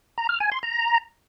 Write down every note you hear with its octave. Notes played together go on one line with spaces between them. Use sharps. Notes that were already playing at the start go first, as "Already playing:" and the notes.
A#5
F6
G#5
C6
A#5